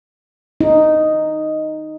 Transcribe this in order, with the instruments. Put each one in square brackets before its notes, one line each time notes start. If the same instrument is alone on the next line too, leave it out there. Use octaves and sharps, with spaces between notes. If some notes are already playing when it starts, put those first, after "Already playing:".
[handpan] D#4